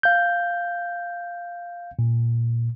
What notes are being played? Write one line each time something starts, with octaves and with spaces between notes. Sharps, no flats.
F5 G6
A#2